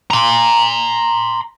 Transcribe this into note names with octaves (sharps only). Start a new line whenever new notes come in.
A#5 C6